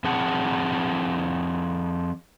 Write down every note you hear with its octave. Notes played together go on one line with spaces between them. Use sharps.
F3 C4 G#4 F#5 A5